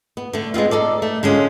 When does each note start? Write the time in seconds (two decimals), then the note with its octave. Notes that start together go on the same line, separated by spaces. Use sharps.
0.17 B3
0.33 D3 A3
0.54 G#3 B3 C4 F4
0.71 D#4 A4 D5
1.02 A3
1.23 D3 G#3 C#4 F4 G4